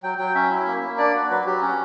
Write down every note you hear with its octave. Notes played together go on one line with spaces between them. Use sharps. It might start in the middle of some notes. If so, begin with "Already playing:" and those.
F#3 G5
F#3 G5
C#4 E5
E4
A#3
A#3
D4 D5
F#4
F#3 B4
F#3 G4
C#4 F#4